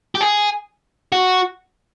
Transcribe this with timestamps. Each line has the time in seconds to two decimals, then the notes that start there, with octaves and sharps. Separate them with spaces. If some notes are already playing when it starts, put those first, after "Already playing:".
0.15 G4
0.21 G#4
1.13 F#4